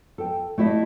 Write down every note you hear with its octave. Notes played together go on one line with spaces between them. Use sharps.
A4 G5
A3 E4 G4 D#5 E5